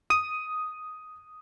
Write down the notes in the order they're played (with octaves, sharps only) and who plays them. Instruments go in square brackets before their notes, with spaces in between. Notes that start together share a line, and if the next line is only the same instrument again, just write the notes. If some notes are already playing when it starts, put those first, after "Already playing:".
[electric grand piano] D#6 D#7